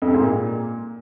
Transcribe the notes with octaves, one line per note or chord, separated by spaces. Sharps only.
F2
C3
G#2
A#2